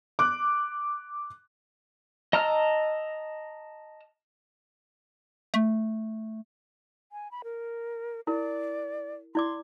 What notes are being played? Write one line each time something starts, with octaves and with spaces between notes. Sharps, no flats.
D6 F#6
D#5 A5 A#5 E6 F6
A3
G#5
B5
A#4
E4 A#4 D5
E4 D5 C6 D6